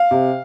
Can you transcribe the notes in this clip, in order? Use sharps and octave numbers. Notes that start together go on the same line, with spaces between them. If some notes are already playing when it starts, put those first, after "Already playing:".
Already playing: F5
C3